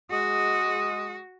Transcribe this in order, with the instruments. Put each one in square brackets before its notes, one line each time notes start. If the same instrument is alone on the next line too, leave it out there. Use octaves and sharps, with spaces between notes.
[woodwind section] G#3 D#6 [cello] F#4